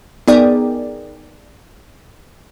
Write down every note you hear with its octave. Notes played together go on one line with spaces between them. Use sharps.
B3 D#4 G#4 A#4 D5 G5